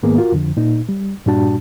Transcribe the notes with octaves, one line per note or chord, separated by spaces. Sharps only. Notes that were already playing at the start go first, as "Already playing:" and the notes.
G#2 D#3 A#3 B3 G#4
F4 F#4 A#4
F2 D3 F3
A#2 D#4
G3
G2 A#2 G3 D4 F#4 A5